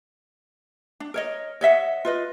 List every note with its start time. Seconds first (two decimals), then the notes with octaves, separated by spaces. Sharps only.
1.00 D4
1.14 A#4 C#5 D#5
1.61 C#5 D#5 E5 F#5
2.05 F4 B4 D#5